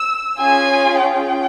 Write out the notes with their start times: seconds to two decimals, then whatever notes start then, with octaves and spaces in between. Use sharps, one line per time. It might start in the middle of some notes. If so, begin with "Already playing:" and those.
Already playing: E6
0.40 C#4 F4 G#4 G#5
1.02 G5